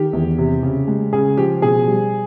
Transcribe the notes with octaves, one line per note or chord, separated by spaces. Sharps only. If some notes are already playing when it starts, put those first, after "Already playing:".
Already playing: D#3 G4
E2
C3
C#3
G#3
C#3 G#4
F3 G4
B2 G#4
G3